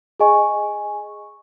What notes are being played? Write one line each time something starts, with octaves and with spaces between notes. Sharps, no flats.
G#4 D#5 G#5 C#6